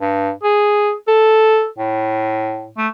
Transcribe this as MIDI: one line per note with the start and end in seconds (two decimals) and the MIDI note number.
0.01 0.31 43
0.43 0.93 68
1.08 1.67 69
1.78 2.69 45
2.77 2.88 57